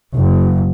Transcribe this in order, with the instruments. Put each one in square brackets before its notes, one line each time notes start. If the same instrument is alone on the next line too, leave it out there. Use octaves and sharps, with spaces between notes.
[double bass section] F#1